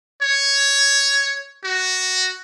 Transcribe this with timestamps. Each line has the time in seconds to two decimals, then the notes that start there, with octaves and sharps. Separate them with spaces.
0.22 C#5
1.64 F#4